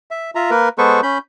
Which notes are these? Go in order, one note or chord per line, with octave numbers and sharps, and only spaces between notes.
E5
F4 E5 A#5
A#3 A#4 B4
G#3 B3 A4 B4 C5 C#6
C#4 B5 G6